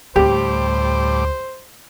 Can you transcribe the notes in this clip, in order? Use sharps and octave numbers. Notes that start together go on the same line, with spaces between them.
D2 A2 G3 G4 C5 D6